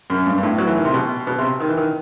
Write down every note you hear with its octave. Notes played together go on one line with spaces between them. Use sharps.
F#2
G2
G2
A2
F#3
E3
D#3
C3
B2
B2
C3
D#3
E3
D#3